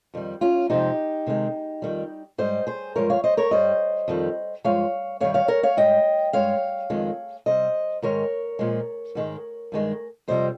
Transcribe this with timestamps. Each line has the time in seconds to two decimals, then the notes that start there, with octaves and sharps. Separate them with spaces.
0.14 F2 D#3 G3
0.41 C#4 F4
0.70 F2 C3 F3 G#3 D#4 G4
1.27 C3 D#3 G#3
1.82 F2 D#3 G3
2.38 G#2 G3 C5 D#5
2.67 G#4 C5
2.95 G2 F3 G#3 A#4 C#5
3.10 C#5 F5
3.24 C5 D#5
3.37 A#4 C#5
3.51 G2 G3 C5 D#5
4.08 F2 D#3 G3
4.64 G2 F3 G#3 C#5 F5
5.20 G2 D#3 G3 C#5 F5
5.34 C#5 F5
5.48 A#4 C#5
5.63 C#5 F5
5.77 G#2 G3 D#5 G5
6.33 G2 F3 G#3 C#5 F5
6.90 F2 D#3 G#3
7.46 C3 G3 C5 D#5
8.02 G#2 D#3 G#3 A#4 C#5
8.59 A#2 F3 G#3
9.15 G#2 D#3 G#3
9.72 G2 D#3 G#3
10.28 F2 C3 G3 C5 D#5